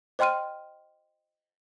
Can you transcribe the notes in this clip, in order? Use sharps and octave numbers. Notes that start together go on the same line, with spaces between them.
C5 D#5 G5 C6 F6 D#7